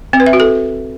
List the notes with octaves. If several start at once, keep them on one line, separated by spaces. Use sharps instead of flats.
C4
B4
E5
F#4
A4